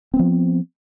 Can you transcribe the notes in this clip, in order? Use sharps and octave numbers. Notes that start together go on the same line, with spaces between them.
F3 B3 C4